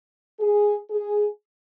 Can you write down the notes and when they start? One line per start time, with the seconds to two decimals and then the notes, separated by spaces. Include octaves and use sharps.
0.40 G#4
0.91 G#4